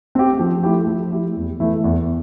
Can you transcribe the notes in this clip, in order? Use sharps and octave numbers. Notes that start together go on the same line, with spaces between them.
C4 G4
F3
A3 E4 G4
F3
A3 E4 G4
E2
E3 A3 E4
E2